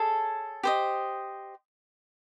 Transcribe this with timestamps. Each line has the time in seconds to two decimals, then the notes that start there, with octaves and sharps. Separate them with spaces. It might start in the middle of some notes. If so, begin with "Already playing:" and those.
Already playing: G#4 A4 C#5 A5
0.63 G4 C5 D#5